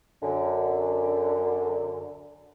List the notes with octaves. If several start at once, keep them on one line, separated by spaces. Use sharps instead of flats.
F#2 D3